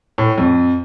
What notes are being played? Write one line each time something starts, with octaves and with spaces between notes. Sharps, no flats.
A2
F2